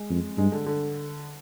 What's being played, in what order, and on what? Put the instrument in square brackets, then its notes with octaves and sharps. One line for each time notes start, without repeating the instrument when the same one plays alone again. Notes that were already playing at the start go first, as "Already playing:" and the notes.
Already playing: [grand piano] G#3
[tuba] F2
[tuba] G2 [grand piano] G#3
[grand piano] D3
D3